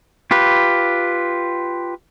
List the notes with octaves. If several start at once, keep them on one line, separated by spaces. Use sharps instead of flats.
F4 G4 B4